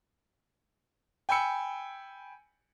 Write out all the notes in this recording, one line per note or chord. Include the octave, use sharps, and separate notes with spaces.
G5 G#5 B5 E6 C#7